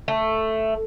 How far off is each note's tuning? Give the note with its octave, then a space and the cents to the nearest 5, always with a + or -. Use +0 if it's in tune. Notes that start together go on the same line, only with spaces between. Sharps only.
A3 +5